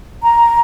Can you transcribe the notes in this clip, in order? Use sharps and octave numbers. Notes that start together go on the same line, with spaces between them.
A#5